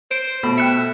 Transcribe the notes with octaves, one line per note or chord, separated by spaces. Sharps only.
C5 D7
B2 A3 B5
E5 G5 F#6 C#7